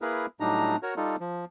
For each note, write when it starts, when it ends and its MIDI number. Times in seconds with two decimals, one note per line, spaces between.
0.02 0.26 58
0.02 0.26 64
0.02 0.26 68
0.02 0.26 70
0.02 0.26 71
0.40 0.76 45
0.40 0.76 54
0.40 0.76 55
0.40 0.76 62
0.40 0.76 63
0.40 0.76 82
0.83 0.94 66
0.83 0.94 70
0.83 0.94 73
0.97 1.16 55
0.97 1.16 63
0.97 1.16 65
0.97 1.16 69
1.20 1.45 53